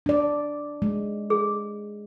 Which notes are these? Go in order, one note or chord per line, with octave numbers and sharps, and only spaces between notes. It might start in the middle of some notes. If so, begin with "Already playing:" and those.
D4 D5
G#3
G#4